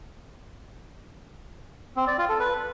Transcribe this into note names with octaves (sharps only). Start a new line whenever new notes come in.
C4
D5
F4
A4
B4